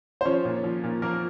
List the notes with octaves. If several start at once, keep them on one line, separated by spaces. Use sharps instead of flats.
C5
F3 C#4 C#5
A#2
F3
A#2
F3 A#3 A#4